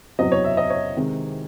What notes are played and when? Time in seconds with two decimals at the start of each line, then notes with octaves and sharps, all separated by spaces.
0.19 F#1 E2 C3 F#3 D#5
0.32 C#5
0.44 E5
0.57 D#5
0.70 C#5
0.97 C3 D#3 G#3